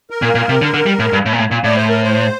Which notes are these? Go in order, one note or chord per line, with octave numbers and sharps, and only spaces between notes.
A#4
A#2
A#2
C3
D3
D3
G3
A2
G2
A2
A#2
A2
A#2
A2 D5
C5
A#4
C5